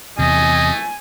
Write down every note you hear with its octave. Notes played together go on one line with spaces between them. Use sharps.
E2 C3 A3 D#5 G#5